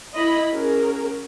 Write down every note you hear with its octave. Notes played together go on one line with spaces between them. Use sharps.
E4 D#5 B5
C#4 F#4 G#4 A#4